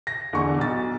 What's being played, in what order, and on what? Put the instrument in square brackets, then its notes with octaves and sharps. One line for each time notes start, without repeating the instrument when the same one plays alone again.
[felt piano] A#6
E2 D3 C#6
B1 A6